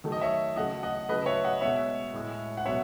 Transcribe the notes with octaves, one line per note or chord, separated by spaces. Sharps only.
D#3 F#3 A3
D#5
C#5 E5
C#3 F#3 A3 D#5 F#5
D#5 F#5
C#3 F#3 A3 B4 D#5
C#5 E5
D#5 F#5
B2 G#3 C#5 E5
A2 G#3
F#5
B2 F#3 C#5 E5